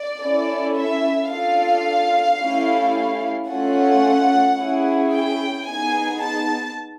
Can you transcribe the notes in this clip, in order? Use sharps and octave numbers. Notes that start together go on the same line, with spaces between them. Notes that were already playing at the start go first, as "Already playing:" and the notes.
Already playing: D5
C#4 E4 A4
E5
D4 F4 A4 F5
A3 C#4 E4 G4
A3 C#4 F4 A4 F#5
C#4 E4 G#4
G5
B3 D#4 G#4 G#5
A5